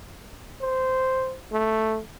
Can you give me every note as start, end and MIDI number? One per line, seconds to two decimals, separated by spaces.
0.62 1.37 72
1.52 2.00 57